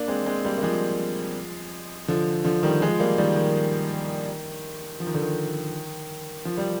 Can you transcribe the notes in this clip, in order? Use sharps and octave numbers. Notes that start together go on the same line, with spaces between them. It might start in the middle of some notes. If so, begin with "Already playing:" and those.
Already playing: A#3 D4
G#3 C4
G#3 C4
G3 A#3
A#3
F3 G#3
D3 F3
D3 F3
D#3 G3
F3 G#3
G3 A#3
D#3 G3
D#3
F3
D#3
D3
D#3
F3
G3